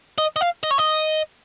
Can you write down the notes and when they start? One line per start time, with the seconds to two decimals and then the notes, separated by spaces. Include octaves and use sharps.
0.18 D#5
0.36 D#5
0.41 F5
0.63 D#5
0.71 C#5
0.78 D#5